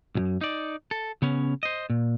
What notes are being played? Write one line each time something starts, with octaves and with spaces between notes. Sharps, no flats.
B1 F#2
D#4 D5
A4
C#3 B3 C#4
C5 D#5
A#2